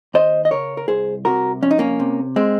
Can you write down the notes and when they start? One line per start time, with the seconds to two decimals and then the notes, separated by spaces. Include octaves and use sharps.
0.14 D#2 C5 D#5
0.45 D#5
0.51 C#3 A#4 C#5
0.77 A#4
0.88 C2 G#4 C5
1.25 C3 F#4 A#4
1.62 F2 C#4
1.71 D#4
1.79 A#3 C#4
2.00 C3
2.36 G#3 C4